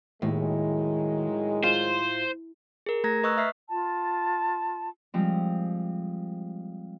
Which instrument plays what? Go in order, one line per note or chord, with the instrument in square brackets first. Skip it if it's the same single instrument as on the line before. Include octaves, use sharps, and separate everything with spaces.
[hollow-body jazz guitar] D#2 [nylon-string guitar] A2 [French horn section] D#3 F#3 G#3
[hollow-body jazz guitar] F4 [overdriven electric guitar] C5
[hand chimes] G#4 A#4
A3 A#5 G#6 A#6
B4 D#5 C#6 D#6 E6 F#6
E5 F6 B6 C7
[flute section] F4 A5
[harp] F3 G3 G#3 C4